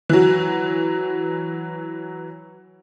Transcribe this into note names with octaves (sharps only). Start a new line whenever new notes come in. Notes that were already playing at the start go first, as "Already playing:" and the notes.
E3 F#3